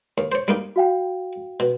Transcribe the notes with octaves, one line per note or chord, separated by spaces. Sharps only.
D#2
C5 C#5
G3 A#3 D#4
F#4 F5 G5
B2